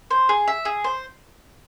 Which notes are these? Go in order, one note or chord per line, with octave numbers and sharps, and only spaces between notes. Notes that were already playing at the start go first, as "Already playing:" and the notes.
C5
G#4
E5
G#4
C5